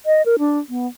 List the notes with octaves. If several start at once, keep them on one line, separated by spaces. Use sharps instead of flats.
D#5
A#4
D4
B3